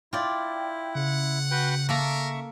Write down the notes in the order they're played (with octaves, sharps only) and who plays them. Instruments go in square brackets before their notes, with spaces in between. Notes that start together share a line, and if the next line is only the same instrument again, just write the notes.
[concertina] E4 [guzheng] F4 D5 [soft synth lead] G5
[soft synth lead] C#3 [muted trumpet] F#5
[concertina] F#4 B4 G5
[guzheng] A#3 A4 A#5 [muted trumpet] A#4 [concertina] E5 C#6